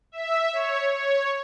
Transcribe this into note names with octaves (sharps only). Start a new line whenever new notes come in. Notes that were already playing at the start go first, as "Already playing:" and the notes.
E5
C#5
C#5